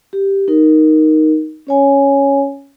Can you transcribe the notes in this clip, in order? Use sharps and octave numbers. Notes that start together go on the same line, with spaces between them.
G4
D#4 A#4
C#4 C#5 G#5